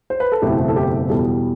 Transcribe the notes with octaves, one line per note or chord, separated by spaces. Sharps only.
C5
B4
A4
F#1 E2 B2 A3 C4 G4
A4
G4
E2 B2 G3 A4